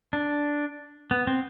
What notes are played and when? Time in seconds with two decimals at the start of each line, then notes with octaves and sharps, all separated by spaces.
0.13 D4
1.11 B3
1.27 C4